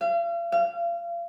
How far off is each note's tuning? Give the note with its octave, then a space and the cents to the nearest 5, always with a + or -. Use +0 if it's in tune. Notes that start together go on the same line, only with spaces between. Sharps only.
F5 -40
F5 -30